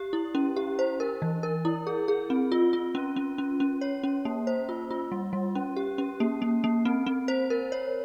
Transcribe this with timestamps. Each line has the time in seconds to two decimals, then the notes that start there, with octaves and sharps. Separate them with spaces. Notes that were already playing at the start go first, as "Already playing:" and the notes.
Already playing: G4
0.13 E4
0.35 C#4
0.56 G4
0.79 C5
1.00 A#4
1.22 E3
1.43 A#4
1.65 E4
1.87 G#4
2.08 G#4
2.30 C4
2.52 F4
2.73 F4
2.95 C#4
3.16 C#4
3.38 C#4
3.60 C#4
3.81 C#5
4.03 C#4
4.25 A#3
4.47 C5
4.69 F4
4.91 F4
5.12 G3
5.33 G3
5.55 C#4
5.76 G4
5.98 C#4
6.20 A#3
6.42 A#3
6.64 A#3
6.85 C4
7.06 C4
7.28 C5
7.50 A#4
7.72 C#5